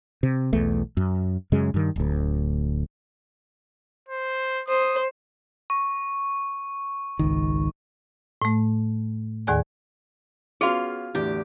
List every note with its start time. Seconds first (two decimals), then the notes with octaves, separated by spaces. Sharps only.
0.23 C3
0.53 B1 E2 A3
0.97 F#2
1.52 F#2 C#3 G#3
1.74 G2 D#3
1.96 D1 D2
4.08 C5
4.68 C5 D#6
5.70 C#6
7.19 G#1 C#2 D#3
8.42 A2 A3
9.47 D#2 A2 D#3 G#4 D5 G#5
10.61 B3 C#4 F4 F#4 G#4 F5
11.15 E2 A2 D3 G4